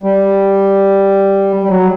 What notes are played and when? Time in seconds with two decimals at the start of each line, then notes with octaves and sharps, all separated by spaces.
0.03 G3
1.63 G3
1.69 F#3